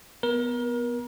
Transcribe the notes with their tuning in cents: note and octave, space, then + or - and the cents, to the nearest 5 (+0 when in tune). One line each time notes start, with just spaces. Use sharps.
B3 +0 A#4 +35